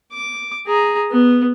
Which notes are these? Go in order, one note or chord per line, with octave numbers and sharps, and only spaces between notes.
D6
G#4 A#5
B3